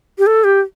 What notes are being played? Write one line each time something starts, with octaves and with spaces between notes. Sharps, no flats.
G4
A4
G4